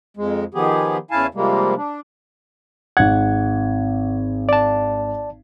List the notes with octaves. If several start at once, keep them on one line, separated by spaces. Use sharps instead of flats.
F2 G#3
D#3 F3 B3 G4 G#4
E2 C#3 E4 F5 G#5 A5
C3 F3 G3 G#3 A#3
D4
G#1 F#5 G#6
D5 A5